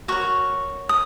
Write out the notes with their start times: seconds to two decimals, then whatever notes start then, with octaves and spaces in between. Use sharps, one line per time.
0.08 F#4 A#4 C#5 C#6
0.89 D#6